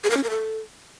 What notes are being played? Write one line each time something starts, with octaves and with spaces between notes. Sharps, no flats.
G#4
A#4
C#4
A#4
A4